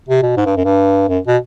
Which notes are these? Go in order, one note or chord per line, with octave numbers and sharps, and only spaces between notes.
C3
B2
G#2
G2
F#2
G2
F#2
B2